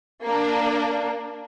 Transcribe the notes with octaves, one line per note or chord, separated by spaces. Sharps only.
A#3 D4